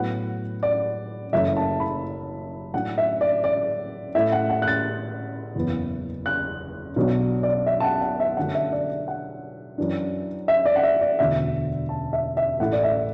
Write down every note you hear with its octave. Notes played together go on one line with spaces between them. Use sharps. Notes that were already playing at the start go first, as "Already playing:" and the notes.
Already playing: A2 F#3 B3 F#5
D5
F#1 F#2 E3 A3 E5
A5
B5
A2 F#3 D4 F#5
E5
D5
D5
A2 A3 E4 E5
F#5
F#5
F#6
A6
F#1 E2 E3 B3
F#6
B1 B2 F#3 D4
D5
E5
A5
F#5
F#5
E5
F#2 D3 F#3 A3 F#5
E5
D5
F#5
F#2 E3 D4
E5
D5
F#5
E5
D5
E1 D2 D3 E5
A5
E5
E5
A1 A2 A3 E4 F#5
D5
E5